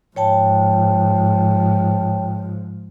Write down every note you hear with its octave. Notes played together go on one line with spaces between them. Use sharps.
G#2 F3 C#5 G5 A5